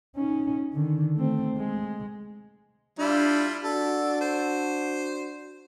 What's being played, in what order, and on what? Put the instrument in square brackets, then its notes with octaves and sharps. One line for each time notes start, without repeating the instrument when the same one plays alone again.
[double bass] C#4 D#4
D3 D#3
A3 C4
G#3
[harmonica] G3 E4 F4 [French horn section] D4
[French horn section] D4 F#4 [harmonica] A4
[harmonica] C5